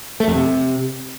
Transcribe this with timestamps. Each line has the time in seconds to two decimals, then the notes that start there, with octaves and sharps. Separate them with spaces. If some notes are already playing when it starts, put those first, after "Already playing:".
0.20 A3
0.28 F2
0.35 C3